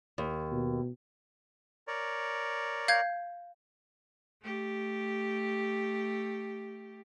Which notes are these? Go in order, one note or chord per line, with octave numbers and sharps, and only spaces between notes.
D#2
B2
A#4 C#5 D5
F5 G6 G#6
A3 G4